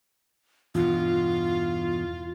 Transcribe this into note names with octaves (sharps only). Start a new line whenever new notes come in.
E2 G2 B2 F4